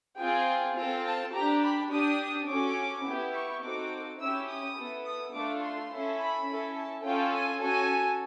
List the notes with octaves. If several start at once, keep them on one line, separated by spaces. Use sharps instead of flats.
C4 F4 G#4 G5
C4 F4 A4
A5
D4 G4 A#5
B5
D4 G4 D#6
C#4 F#4 A4 D6
B3 E4 G4
C#6
C4 D#4 F#4 A4 D6
C#4 E4 G4 E6
D#6
B3 E4 A4
D#6
A3 D4 F4 A4 D6
C6
C#4 E4 A4
B5
C#4 E4 A4
A5
C#4 F4 A4 G5
G#5
C#4 F#4 A4 G#5